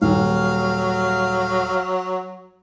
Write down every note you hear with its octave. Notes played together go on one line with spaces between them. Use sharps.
D#1 F#3 F5